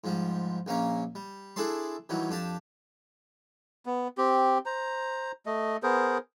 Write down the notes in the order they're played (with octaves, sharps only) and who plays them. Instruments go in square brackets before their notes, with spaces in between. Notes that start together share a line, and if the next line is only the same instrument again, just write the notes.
[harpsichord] G#2 F3 G3
A#1 A#3 C#4 A#5
G3
D4 E4 G#4 A4 D5 C6
D#3 E3 F#3 G3
F2 D4 G4 A5
[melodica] B3
C4 G4
C5 A#5
A3 D#5
B3 G#4 A#4 C5